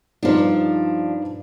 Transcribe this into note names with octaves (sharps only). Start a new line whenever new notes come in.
G2 F3 D4 D#4